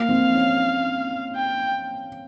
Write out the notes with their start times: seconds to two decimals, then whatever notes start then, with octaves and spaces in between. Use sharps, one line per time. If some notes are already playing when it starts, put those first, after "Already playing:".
Already playing: A#3 F5
0.09 C4
0.35 C#4
1.36 G5